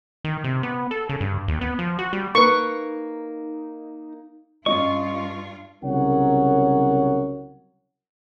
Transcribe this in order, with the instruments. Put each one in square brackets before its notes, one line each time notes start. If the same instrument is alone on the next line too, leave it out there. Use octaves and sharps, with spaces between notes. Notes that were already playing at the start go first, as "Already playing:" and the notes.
[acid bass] D#3
C3
B3
A4
C#3
G2
D#2
B3
F3
F#4
G3
[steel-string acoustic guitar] A#3 [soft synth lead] D#4 [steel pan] B4 C#6
[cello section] G2 F4 [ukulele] C#4 D#4 D#5 [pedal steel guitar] C#6
[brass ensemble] C2 C#3 F#3 A#4 C#5 F#5